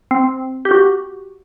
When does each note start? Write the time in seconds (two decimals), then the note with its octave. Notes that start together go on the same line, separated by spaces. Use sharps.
0.11 C4
0.65 G4
0.71 F#4